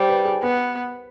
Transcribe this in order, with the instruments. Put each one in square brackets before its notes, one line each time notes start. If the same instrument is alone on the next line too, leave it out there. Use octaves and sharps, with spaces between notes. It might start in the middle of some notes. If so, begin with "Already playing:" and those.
Already playing: [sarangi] G3 [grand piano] C5
[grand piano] B4
G#4
[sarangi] B3 [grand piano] B4